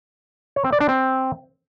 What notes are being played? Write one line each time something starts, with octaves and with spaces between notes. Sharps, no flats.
C#5
C4
D5
D4
C4